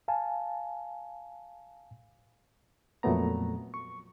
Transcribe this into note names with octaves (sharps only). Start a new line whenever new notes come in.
F5 G#5 A5
F2 A#2 F#3 A3 B3 A#5
C#6